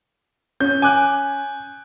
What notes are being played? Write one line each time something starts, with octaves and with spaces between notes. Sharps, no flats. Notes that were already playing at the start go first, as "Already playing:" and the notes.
C#4 G6
G#5 D6 F#6